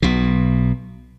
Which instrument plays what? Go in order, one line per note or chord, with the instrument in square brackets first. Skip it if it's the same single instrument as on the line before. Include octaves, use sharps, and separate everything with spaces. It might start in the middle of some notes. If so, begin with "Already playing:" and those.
[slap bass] B1 B2